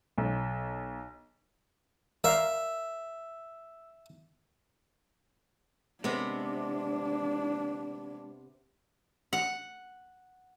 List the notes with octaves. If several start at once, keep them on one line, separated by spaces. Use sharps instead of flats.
B1
A#4 D5 E5 F5 E6
C3 G#3 B3 D4
F#5